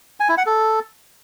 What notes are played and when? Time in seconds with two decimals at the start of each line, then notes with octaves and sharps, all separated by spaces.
0.20 G#5
0.29 E4
0.37 F#5
0.46 A4